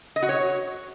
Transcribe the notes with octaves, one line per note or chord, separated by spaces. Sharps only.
D#5
F#4
C#5